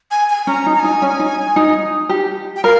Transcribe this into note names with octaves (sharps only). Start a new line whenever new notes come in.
G#5
G#5
C#4 A#5
D#4
A#5
D#4 G#5
C#4
D#4
D#4
G4
G5
A#4 F5